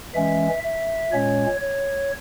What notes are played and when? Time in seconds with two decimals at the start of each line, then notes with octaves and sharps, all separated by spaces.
0.14 E3 G#3 C#4 E5
0.63 E5
1.12 A#2 G#3 C#4 C#5
1.61 C#5